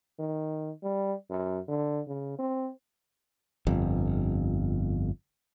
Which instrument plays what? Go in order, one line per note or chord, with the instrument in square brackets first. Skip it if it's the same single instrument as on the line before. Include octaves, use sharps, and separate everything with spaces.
[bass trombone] D#3
G3
F#2
D3
C#3
C4
[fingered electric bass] G1 F2